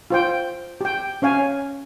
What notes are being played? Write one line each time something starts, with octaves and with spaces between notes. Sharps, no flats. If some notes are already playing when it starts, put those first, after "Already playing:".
F4 C5 G5
G4 G5
C#4 C#5 F5 G#5